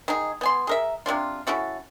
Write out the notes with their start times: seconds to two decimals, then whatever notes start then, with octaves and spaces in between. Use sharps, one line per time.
0.08 D#3 D#4 G#4
0.41 B3 G#5 C6
0.67 G#4 A#4 E5
1.06 C3 F3 D4 F4
1.47 C#4 E4 F#4 A4